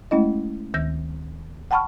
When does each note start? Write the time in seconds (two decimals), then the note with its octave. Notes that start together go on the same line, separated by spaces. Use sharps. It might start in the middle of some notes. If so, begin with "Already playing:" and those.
0.11 G#3 A3 C#4 E4 D#5
0.74 D2 D#3 G6 A#6
1.71 F#5 G5 A5 B5 C#6 F6